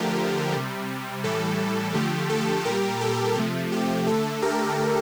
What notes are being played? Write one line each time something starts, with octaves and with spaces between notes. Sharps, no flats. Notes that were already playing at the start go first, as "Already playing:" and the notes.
Already playing: D3 F3 A3 G4 A#4
C3 G3
A2 E3 G3 A4
D3 F3 A3 G4
A4
A#2 G3 G4 A#4
A4
C3 F3 A3
G4
D3 A3 A4
G4 A#4